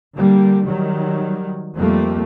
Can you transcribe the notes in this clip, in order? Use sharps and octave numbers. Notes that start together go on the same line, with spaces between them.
D3 G3 A#3
D#3 F#3 G3
F2 G3 A3 A#3